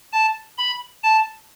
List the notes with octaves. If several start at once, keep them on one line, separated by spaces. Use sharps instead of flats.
A5
B5
A5